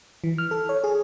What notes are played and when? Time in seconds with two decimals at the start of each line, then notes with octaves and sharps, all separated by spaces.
0.24 E3
0.38 F6
0.51 A4
0.69 C#5
0.84 G#4